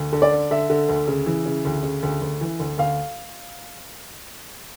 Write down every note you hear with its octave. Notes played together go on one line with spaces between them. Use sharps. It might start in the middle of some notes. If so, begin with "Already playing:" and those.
Already playing: D2
D3
D5
D3
D3 E5
D3
D2
C#3
E3
C#3
D2
C#3
D2
D2
E3
D2
D2 F5